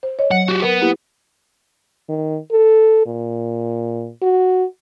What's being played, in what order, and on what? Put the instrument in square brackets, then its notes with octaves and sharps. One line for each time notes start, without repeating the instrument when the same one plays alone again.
[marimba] C5
C#5 D#5
[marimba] F#3 [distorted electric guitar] F#5
[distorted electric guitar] F#4 G4
[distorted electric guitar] B3 [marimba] A#4
[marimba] A#3 E4 G4
[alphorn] D#3
A4
A#2
F#4